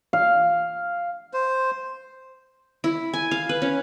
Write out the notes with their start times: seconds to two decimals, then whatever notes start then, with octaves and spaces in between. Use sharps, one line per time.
0.13 F5
1.34 C5
2.84 E4
3.14 G#5
3.31 F5
3.49 B4
3.62 C#4